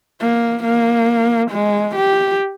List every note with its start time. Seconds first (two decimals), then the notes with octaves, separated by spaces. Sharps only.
0.20 A#3
0.64 A#3
1.51 G#3
1.96 G4